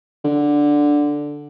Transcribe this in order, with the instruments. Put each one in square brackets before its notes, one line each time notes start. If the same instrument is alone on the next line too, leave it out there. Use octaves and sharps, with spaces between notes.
[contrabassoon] D3